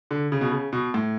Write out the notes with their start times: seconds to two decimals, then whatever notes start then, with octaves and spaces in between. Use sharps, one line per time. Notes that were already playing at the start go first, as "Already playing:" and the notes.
0.11 D3
0.32 C#3
0.41 B2
0.52 C#3
0.73 B2
0.94 A2